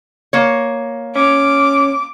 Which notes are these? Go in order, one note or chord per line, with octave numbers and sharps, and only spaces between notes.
A#3 C#5
C#4 D6